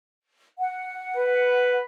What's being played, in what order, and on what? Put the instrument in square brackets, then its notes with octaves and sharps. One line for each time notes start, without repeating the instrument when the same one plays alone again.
[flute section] F#5
[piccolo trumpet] B4